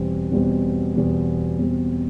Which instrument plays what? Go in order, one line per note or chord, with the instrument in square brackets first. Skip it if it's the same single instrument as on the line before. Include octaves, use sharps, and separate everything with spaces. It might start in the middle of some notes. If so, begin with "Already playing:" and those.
Already playing: [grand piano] E2 B2 G3 C4
E2 B2 G3 C4
E2 B2 G3 C4
E2 B2 G3 C4